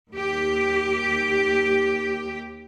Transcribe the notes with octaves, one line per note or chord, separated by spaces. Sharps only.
D#2 G4